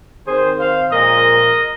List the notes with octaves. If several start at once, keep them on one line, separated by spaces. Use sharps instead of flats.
D#3 C4 G#4 C5
C5 F5
A#2 F3 G#3 A#4 D#5